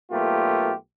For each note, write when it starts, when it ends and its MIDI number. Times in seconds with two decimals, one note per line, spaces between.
0.11 0.72 35
0.11 0.72 57
0.11 0.72 58
0.11 0.72 65
0.11 0.72 67
0.11 0.72 71